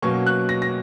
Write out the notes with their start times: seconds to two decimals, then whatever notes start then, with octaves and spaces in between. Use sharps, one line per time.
0.02 B2 F#3 A#3 C#4 C#6
0.26 F#6
0.49 A#6
0.62 A#6